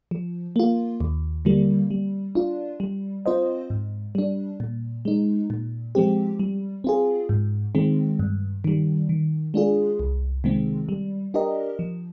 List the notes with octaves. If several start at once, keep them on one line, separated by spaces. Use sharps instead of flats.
F3
A#3 F4
D#2
D3 G3 A#3
G3
D4 F4
G3
C4 F4 C5 D#5
G#2
G3 D4
A#2
G#3 D#4
A#2
F3 G#3 C4 G4
G3
C4 F4 G#4
G#2
D#3 G#3 C4
G2
D#3 G3
D#3
G#3 D4 F4 G#4
C2
C3 D#3 G#3 C4
G3
D4 G4 A#4 D#5
F3